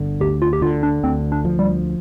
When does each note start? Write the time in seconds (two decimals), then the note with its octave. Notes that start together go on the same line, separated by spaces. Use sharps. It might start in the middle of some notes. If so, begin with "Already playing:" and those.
Already playing: G1 D3
0.20 D2 G4
0.42 F4
0.53 G4
0.62 D3 F4
0.83 D4
1.04 D2 C4
1.32 D4
1.45 F3
1.59 G3